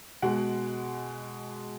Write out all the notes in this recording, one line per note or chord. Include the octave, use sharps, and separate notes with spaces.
B2 G#3 F#5